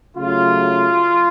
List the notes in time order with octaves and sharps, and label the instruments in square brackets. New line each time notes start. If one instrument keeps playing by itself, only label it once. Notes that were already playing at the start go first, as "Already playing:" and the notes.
[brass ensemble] C#3 F#3 A3 F4